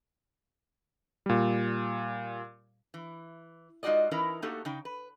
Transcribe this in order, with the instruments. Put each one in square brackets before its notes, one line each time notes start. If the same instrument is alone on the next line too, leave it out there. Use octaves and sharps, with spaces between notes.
[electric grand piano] A#2 G3
[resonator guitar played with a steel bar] E3
G#3 D#4 F4 F#4 D5 D#5
E3 C#4 D#4 E4 A#4 B4
A3 A#3 D#4 F#4 G4 A4
C#3 D#4 G5
B4